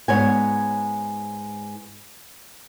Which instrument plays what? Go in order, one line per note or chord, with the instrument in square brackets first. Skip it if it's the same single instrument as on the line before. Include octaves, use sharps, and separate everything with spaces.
[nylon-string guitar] G#2 B3 C#5 G#5